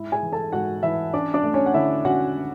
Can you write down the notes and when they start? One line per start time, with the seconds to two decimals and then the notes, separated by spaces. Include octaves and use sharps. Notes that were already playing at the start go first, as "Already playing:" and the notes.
Already playing: G#2 E4 E5
0.12 G#4 G#5
0.23 E3
0.33 A4 A5
0.52 G#2 F#4 F#5
0.83 E3 E4 E5
1.14 C#4 D4 D5
1.34 D4 D5
1.43 A3
1.54 C#4 C#5
1.66 F#5
1.74 D3 E4 E5
2.05 C#4 F#4 F#5